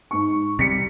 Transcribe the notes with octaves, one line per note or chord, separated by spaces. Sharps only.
G#2 C#6
C3 G3 B6 C#7